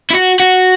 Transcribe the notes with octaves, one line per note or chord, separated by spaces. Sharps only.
E4
F#4
F#4